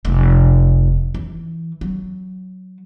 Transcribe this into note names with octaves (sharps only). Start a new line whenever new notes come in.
F1
E3
F#3